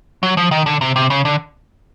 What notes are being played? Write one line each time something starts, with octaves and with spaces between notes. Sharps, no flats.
F#3
F3
D#3
D3
C3
C3
C#3
D3